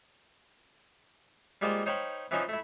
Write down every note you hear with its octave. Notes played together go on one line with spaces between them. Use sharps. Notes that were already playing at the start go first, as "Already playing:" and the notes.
G3 G#3 A#3 F4 C5
D#4 C5 C#5 F5 G5 B5
E3 F3 C#4 D#4
A3 E4